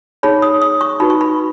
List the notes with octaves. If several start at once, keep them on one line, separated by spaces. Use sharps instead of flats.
D#4 G#4 C#5 B5
D#6
D#6
C#6
D#4 F#4 B4 B5
C#6
B5